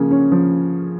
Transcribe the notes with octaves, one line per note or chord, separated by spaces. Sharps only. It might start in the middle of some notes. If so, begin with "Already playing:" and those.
Already playing: C#3 F3 A#3 C#4
C#4
F3